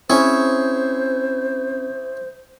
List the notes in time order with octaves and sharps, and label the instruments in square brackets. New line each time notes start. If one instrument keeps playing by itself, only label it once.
[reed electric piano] C4 C#4 [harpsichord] E4 G#4 C#5 [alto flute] C5